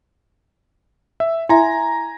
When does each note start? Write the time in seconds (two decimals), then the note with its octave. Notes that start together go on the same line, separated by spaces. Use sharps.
1.20 E5
1.49 E4 E5 G#5 A#5